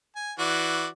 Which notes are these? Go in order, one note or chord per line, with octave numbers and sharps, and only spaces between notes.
G#5
E3 F#4 D5